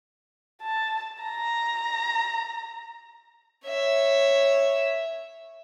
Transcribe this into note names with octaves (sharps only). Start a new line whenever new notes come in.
A5
A#5
C#5 E5